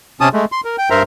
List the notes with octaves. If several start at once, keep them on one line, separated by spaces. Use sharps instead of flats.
C3 C#4 A5 D#6
G#3 A3
C6
A#4
G5
G2 A#4 C5 E5 A#5